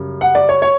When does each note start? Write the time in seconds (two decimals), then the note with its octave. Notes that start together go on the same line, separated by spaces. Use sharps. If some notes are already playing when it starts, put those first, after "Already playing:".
Already playing: F#2 C#3 G3
0.21 F#5
0.35 D5
0.49 C#5
0.62 C#5